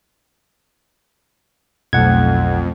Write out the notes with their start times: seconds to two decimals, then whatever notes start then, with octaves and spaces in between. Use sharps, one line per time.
1.93 B1 F2 B2 A3 F#5 G#6